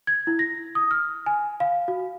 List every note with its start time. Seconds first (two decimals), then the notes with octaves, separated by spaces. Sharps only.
0.07 G#6
0.27 E4
0.39 A#6
0.75 D#6
0.91 F6
1.26 G#5
1.60 F5
1.88 F#4